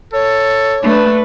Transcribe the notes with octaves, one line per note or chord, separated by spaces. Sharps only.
A4 C#5
A3 D4 B4